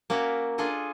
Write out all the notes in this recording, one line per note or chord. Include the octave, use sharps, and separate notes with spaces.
A#3 C#4 F#4 A#4 D5 E5
D4 F4 G#4 A4 D#5